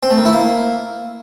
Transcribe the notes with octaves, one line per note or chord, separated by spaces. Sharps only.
C4
A3
D#3
E4
A#3